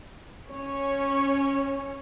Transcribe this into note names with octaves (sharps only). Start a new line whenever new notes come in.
C#4 C#5